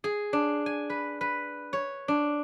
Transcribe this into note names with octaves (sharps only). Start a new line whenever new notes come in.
G#4
D4
G#5
B4
B4
C#5
D4